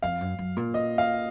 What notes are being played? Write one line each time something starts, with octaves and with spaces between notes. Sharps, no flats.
F2 F5
F#2
F#2
A#2
D#5
F5